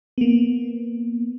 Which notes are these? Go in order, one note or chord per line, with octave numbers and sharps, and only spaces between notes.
A#3 B3